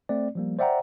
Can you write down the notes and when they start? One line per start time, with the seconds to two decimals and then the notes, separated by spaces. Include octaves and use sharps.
0.09 A3 C4 D5
0.35 F3 G3 A#3
0.59 C5 D5 E5 F#5 G5 A#5